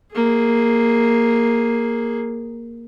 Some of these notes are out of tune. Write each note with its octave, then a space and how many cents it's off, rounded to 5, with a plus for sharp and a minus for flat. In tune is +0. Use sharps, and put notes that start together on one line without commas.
A#3 +0 G#4 +0